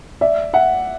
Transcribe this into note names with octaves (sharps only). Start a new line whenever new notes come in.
D5 E5
E5 F#5